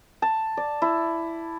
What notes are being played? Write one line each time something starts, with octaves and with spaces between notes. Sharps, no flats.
A5
D5
E4